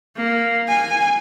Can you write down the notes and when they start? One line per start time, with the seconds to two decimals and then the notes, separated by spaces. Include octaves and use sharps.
0.17 A#3
0.68 G#5